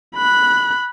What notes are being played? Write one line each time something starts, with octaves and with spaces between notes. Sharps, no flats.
B5 F#6